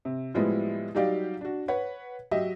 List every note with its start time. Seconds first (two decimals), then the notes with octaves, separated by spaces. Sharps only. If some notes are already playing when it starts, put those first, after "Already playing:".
0.05 C3
0.34 A2 F3 G3 G#3 B3 E4
0.95 F#3 G3 D#4 G4 D5 F5
1.41 D4 F#4
1.68 B4 C#5 F#5
2.31 F#3 G4 D#5 E5